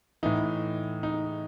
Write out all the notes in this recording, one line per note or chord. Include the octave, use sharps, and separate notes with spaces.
A2 E3 D#4
D#4